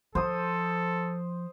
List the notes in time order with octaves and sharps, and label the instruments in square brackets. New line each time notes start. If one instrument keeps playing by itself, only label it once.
[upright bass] F3 [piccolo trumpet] A4 [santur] C5 D#6